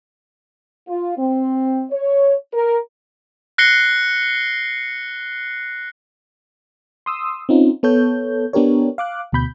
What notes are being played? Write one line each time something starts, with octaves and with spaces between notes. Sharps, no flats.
F4
C4
C#5
A#4
F#6 A#6 C7 C#7 G7
C6 D#6 E6
C4 C#4 D#4 F4
B3 A4 C#5 G6
B3 D4 G4 A#4 C#5
F5 D6 F#6
D2 B2 B5 G6